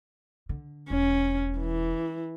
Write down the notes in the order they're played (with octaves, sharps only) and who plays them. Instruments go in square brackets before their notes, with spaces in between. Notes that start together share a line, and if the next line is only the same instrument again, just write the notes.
[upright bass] D3
[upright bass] E1 [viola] C#4
[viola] E3